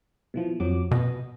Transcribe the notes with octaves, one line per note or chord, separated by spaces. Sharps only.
B2 E3 F3
F2 F#3 D6
B2 B3 D#5